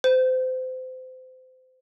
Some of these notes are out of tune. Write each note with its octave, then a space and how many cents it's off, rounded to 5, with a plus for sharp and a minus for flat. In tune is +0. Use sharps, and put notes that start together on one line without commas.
C5 -30